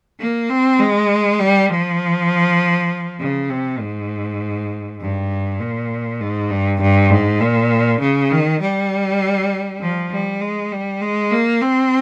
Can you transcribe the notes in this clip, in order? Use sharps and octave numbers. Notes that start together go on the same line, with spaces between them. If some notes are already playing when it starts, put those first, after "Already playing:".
A#3
C4
G#3
G3
F3
C#3
C3
G#2
G2
A#2
G#2
G2
G2
G#2
A#2
C#3
D#3
G3
F3
G3
G#3
G3
G#3
A#3
C4